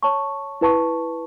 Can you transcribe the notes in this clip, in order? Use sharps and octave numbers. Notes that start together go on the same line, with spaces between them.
C#5 A5 C#6
E4 B4 A5 C#6